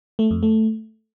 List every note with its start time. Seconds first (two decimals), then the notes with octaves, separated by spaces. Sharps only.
0.19 A3
0.31 F2
0.43 A3